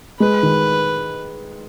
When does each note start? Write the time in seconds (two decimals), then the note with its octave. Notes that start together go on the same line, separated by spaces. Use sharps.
0.20 G#3 B4
0.43 D#3